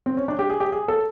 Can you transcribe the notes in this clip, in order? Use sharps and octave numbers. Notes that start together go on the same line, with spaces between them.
C4
C#4
D4
G4
G#4
G4
G#4
A4